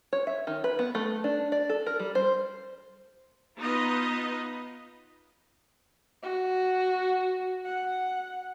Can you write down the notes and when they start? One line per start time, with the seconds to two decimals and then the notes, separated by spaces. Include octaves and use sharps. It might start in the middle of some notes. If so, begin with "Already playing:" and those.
0.13 C#5
0.27 E5
0.47 D#3
0.64 B4
0.79 B3
0.95 A3
1.24 D4
1.52 D5
1.69 A4
1.86 A#4
2.00 G3
2.15 C5
3.59 B3 D#4 F4 B4 D#5
6.23 F#4
7.65 F#5